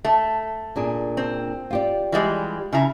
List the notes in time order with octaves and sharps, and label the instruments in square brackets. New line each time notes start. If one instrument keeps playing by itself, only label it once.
[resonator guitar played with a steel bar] A3
[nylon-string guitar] A#2 D4 G#4
[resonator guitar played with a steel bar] C4
[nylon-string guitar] F4 G4 D5
[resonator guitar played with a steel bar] E3 G3 G#3
C#3 E4 A#5